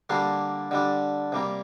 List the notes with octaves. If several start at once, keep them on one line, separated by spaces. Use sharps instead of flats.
D3 G3 A#3 D4 C6
D3 G3 D4
C3 G3 A#3